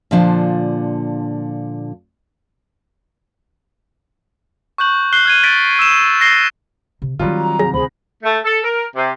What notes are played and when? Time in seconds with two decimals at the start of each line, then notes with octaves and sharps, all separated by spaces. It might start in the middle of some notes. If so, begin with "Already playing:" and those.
0.11 A#2 D3 F3 D4
4.78 C#6 F#6 G6 F#7
5.13 F#6 C7 G7
5.25 F6 G#6 D#7
5.43 A6 B6 D7
5.79 E6 E7
6.21 A#6 C7 G7
7.02 C3
7.19 D#3 F#3 G3 C4 F4
7.39 A#5
7.59 C2 F#3 G#4 A#6
7.74 D2 G#4 C5 B5
8.23 A3
8.44 A4
8.64 A#4
8.96 C3